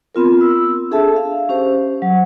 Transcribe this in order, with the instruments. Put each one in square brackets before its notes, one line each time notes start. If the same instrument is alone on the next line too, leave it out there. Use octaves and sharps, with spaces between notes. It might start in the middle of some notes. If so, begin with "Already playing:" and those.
[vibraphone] B3 C4 F4 A#4
E6
D4 G#4 A4 E5 A5
F5
C#4 G4 C5
F#3